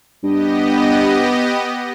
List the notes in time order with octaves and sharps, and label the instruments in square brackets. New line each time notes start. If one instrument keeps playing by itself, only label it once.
[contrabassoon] G2 [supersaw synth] B3 G4 D#5